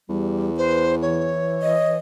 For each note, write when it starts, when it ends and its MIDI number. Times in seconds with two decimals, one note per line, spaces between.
0.09 1.53 40
0.09 0.50 55
0.58 0.85 71
0.58 0.95 72
1.02 1.98 52
1.02 1.96 73
1.62 1.96 75